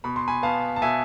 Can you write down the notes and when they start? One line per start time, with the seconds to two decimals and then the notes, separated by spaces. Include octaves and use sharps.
0.04 B2 B5
0.16 C6
0.28 G#5 B5
0.43 B3 F5 A5
0.76 A5
0.82 B2 E5 G#5